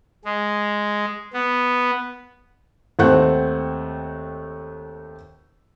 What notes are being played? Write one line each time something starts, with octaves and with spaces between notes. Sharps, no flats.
G#3
B3
D#2 A3 C4 F#5 F#6 G6